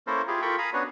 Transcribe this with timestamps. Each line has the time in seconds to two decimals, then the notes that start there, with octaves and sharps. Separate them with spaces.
0.07 A#3 C#4 E4 A4 A#4 C5
0.27 E4 F4 G4 G#4
0.42 F4 A4 A#4 G5 B5 C#6
0.58 F5 G#5 A#5 B5 D#6
0.73 B3 C#4 D4 F#4 B4 C#5